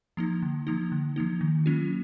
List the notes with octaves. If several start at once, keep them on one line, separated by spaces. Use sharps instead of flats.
F3 A#3 D#4
D3
F3 A#3 D#4
D3
F3 A#3 D#4
D#3
F#3 A#3 C#4 F4